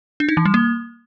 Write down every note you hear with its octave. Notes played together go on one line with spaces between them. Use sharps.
D4
D#4
E3
G3
A#3